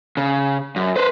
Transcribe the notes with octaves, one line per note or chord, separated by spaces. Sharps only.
C#3
F#2
B4 C5